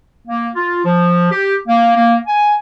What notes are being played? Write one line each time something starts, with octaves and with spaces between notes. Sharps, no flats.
A#3
F4
F3
G4
A#3
A#3
G#5